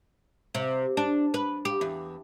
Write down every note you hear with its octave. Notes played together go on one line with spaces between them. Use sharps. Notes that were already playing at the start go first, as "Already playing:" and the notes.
C3
D4
B4
G4
E2